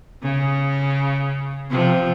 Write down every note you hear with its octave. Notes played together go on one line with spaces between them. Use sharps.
C#3
C3 F3